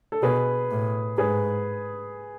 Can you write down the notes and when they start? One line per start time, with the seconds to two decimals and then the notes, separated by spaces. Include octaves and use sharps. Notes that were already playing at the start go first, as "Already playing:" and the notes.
0.12 A4
0.22 B2 G#4 B4
0.71 A2
1.18 G#2 G#4 B4